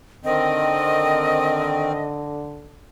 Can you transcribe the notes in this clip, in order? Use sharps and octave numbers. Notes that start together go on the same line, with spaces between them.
D3 D#3 C4 D#5